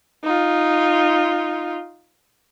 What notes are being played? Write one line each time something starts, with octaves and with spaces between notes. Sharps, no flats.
D#4 F4